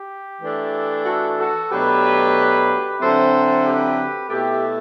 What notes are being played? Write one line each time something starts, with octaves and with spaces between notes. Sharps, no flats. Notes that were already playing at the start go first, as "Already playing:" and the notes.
Already playing: G4
E3 A3 D4
F#4 A4
F#4 A4
B2 F#3 A3 D4 G4 B4
D3 F#3 C4 E4 A4 C5
G4 B4
B2 A3 E4 G4